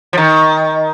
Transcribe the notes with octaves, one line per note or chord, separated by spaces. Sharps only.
F3
D#3